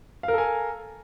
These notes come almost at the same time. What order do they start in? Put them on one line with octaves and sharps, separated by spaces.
F5 A#4 A4 G#5